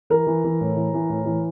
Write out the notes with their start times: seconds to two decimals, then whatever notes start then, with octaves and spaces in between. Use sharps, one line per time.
0.10 E3 A#4
0.27 E3
0.44 E3
0.61 A2
0.77 E3
0.94 E3
1.10 A2
1.26 E3